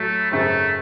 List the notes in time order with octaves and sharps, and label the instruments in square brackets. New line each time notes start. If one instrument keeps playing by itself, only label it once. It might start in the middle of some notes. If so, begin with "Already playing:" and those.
Already playing: [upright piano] A2 F#3 [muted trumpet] A3
[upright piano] G#1 F#2 C#3 [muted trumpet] A3